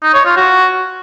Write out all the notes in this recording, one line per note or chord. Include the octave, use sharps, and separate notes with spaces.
D#4
C#5
F4
F#4